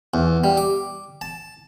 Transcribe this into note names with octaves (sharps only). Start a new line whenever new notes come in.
E2
G3
D6
A5